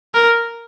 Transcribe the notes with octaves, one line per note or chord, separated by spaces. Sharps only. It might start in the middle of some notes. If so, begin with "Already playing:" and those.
A#4